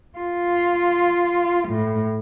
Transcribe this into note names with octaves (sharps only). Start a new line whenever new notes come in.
F4
A2